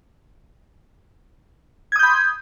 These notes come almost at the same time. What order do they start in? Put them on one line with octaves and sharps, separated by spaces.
G#6 D#6 G6 B5 C6